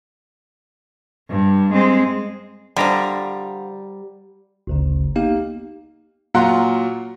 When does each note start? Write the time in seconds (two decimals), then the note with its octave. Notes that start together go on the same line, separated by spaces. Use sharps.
1.29 G2
1.73 G#3 C4
2.77 D3 F3 G3 A#5
4.67 G#1 D2 C#3
5.15 A#3 B3 D#4 G4 F5
6.34 A#2 F#3 F4 F#5 A#5 C6